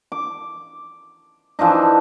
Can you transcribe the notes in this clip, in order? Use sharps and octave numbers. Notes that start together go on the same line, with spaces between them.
D6
E3 F3 D4 D#4